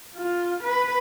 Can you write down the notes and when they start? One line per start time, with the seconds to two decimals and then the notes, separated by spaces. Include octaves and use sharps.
0.16 F4
0.63 B4